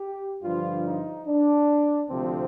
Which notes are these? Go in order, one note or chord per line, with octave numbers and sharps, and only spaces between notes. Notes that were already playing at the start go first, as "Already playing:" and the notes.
Already playing: G4
G2 D3 F3 F4
D#4
D4
D2 C3 F3 C4